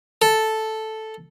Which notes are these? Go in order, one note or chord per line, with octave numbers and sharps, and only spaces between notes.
A4